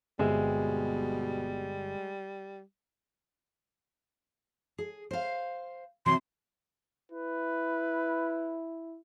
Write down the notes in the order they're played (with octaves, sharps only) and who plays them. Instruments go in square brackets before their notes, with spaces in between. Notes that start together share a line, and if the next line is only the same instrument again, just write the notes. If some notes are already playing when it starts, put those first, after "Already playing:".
[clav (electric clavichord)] G1 C4 E5 [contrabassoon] B2 [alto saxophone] G3 [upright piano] G#3
[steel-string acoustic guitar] G#4
C5 F5
[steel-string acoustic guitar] C3 E3 F#3 [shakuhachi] C6
[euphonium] E4 [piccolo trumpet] B4